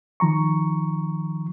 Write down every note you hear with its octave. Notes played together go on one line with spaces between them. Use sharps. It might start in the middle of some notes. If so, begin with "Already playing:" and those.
D#3 F3 A#5 C#6